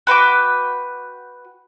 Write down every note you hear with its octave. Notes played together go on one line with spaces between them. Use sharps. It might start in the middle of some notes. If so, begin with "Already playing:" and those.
F#4 B4 G5 D6